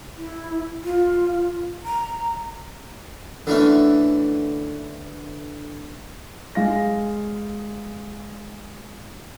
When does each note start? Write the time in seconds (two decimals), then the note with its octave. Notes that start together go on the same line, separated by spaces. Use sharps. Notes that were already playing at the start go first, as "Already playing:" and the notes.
0.17 E4
0.84 F4
1.84 A#5
3.47 D3 E3 A3 C#4
6.55 G#3 F5 A#6